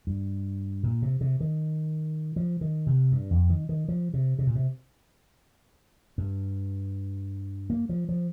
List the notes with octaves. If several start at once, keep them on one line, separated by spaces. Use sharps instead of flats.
G2
A#2
C3
C3
D#3
F3
D#3
C3
G2
F2
D#3
D#3
F3
C3
C3
A#2
C3
G2
A#3
F3
F3